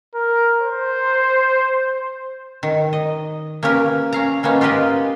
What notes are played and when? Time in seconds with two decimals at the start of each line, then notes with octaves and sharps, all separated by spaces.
0.15 A#4
0.62 C5
2.63 D#3
2.93 D#5
3.63 A#3 C#4 G4 A#4 B4
4.13 C#4 F5 A#5
4.43 G3 A#3 B3 C#4 D#4
4.61 F4 G4 A#4 B4 D#5